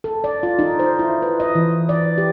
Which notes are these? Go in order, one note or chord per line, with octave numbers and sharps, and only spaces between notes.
A4
D5
F4
D#4
C5
E4
B4
D#5
E3
D5
G4